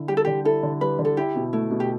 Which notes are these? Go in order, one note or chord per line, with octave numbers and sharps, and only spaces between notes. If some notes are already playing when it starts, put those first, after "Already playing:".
Already playing: D3 E4
G3 G4
A4
D3 G4
E4 A4
D3
G3 B4
D3
A4
E4 G4
B2
A3 E4
B2
G4